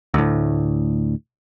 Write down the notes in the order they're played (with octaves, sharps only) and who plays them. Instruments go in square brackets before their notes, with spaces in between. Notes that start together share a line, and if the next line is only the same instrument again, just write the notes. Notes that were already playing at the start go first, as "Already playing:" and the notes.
[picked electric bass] D2 A2